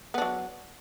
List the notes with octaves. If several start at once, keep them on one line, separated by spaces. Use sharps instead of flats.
F#3 B3 D4